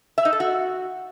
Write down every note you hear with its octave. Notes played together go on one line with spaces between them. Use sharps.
E5
D#4
A4
F#4